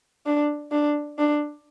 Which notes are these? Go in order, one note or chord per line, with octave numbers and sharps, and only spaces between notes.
D4
D4
D4